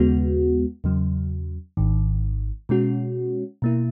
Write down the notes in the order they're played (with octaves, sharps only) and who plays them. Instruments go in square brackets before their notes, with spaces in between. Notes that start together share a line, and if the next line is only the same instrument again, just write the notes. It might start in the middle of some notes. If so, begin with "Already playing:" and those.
Already playing: [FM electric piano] D#2 C#3 G#3 B3 F#4
E2 C#3 F#3
G#1 G#2 D#3
B2 G#3 C#4 F#4
B2 A#3 E4